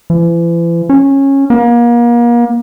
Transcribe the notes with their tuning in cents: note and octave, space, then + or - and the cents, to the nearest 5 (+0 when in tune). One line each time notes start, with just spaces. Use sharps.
E3 +40
C#4 -15
A#3 +35